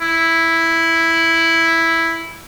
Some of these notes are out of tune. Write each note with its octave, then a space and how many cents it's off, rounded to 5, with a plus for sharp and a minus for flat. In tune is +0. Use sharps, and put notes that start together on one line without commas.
E4 +0